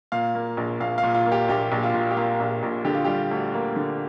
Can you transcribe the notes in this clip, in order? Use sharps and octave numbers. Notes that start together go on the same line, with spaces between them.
A#2 F5
A#3
A#1
A#1 F5
F5
A#2
F4
A#3
G4
A#1 G4
A#1
F4
A#2
G4
A#3 F4
A#1
A#1
D3 G4
F4
G3 G4
D2
A#3
D3